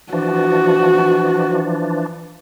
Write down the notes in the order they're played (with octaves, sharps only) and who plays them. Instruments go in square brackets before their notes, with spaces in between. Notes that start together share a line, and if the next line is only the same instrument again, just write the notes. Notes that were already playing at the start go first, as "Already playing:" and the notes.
[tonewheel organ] E3 F3 D4 [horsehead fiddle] F#4